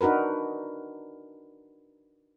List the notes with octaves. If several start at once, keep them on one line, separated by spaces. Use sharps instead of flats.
D4 D#4 F#4 A#4 B4